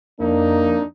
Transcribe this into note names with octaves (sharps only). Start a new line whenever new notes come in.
F2 A#3 D4 D#4